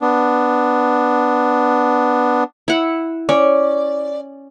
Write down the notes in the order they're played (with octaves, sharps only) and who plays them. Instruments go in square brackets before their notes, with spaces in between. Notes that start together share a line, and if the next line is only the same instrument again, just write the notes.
[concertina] B3 D4
[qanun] E4 F#5
[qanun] C#4 [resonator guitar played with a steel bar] D5